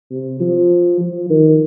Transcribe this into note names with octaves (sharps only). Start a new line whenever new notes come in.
C3
F3
F3
D#3